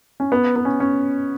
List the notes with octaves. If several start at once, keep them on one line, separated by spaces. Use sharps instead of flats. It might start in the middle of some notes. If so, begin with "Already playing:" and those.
C#4
B3
B3
C#4
C#4